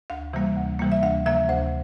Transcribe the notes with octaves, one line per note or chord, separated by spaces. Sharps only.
D2 F5
C3 E3 G3 A#3
D2
C3 E3 G3 A#3
E5
D2 F5
C3 F3 A#3 E5
D2 C5